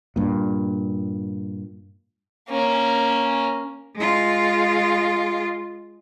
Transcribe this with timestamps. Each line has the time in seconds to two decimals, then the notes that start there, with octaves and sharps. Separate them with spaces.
0.16 G2 A#2
2.50 A#3 C#4
3.95 G#3 F4